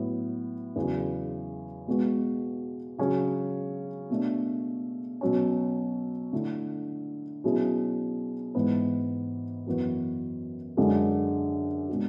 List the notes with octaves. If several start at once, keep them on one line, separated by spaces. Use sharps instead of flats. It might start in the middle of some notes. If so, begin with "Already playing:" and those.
Already playing: A2 F#3 B3
E2 C#3 F#3
B2 G#3 B3 F#4
C#3 F#3 C#4 G#4
B2 A3 D4
B2 F#3 C#4
D3 A3 E4
B2 F#3 C#4 E4 G#4
G#2 E3 B3
F#2 E3 B3 F#4
F#2 D3 G#3
B2 G#3 D4 G#4